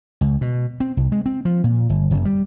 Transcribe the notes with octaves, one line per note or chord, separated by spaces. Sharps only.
C#2
B2
C4
C2
G#3
C4
F3
A#2
G1
F#1
G3